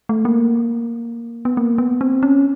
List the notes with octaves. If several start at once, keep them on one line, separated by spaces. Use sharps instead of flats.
A3
A#3
B3
A#3
B3
C4
C#4